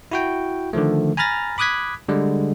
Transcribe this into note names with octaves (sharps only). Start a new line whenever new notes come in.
E4 F#4 G5
D3 D#3 F3 A3
G#5 A#5 B5 F6 A6 A#6
B5 D6 D#6 F#6 G#6 B6
D3 G3 G#3